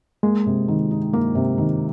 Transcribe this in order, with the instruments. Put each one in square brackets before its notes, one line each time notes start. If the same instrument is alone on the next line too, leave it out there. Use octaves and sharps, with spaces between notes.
[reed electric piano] G#3 [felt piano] A#3
[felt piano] C3
D#3
D#4
A#3
C3
D#3